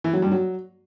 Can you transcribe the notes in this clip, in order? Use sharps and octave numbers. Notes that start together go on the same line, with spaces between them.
E3
F#3
G2
F#3